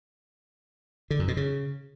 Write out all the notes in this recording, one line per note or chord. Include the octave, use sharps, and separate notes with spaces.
D3
F#2
B2
C#3